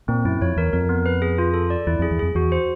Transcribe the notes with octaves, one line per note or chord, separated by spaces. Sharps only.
A#2 C4
F#2 E4
F2 C#5
E2 A#4
F2 A#4
B3
B4
G#4
F4
A4
D5
E2 E4
F2 G#4
E2
F2 G#4
E2 F#4
C5